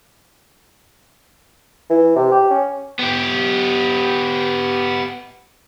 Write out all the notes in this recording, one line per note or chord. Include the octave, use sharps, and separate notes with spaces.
E3
C3
G4
C#4
B3 G4